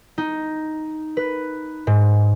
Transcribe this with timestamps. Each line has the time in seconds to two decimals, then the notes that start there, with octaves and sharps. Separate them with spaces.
0.18 D#4
1.17 B4
1.87 G#2